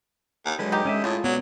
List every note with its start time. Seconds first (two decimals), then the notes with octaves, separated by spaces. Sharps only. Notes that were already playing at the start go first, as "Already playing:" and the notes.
0.46 D#2
0.59 D3 F#3 G#3 B4
0.72 D#4 G4
0.85 G#3 C#4 D#5 E5
1.04 A2 C#3 F4
1.24 F#3 B3 D5